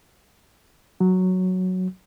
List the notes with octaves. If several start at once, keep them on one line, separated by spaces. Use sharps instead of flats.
F#3